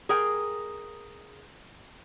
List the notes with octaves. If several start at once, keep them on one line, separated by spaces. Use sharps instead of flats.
G#4 A#4 G5